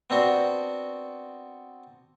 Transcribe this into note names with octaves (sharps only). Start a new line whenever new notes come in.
B3 C4 D4 F#4